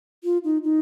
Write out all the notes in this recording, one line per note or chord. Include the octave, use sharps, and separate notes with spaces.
F4
D#4
D#4